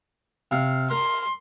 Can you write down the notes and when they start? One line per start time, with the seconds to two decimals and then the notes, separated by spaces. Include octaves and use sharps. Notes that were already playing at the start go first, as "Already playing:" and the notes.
0.51 C3 F5
0.91 A#4 C6